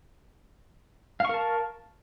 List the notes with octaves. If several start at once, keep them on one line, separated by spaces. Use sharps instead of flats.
A#4 F5 A5 C#6